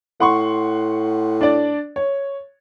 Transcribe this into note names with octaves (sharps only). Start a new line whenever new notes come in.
A2 F#5 C6 C#6
D4 D5
C#5